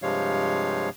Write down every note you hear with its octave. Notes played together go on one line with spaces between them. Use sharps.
G2 C3 F3 G#3 C#5 F5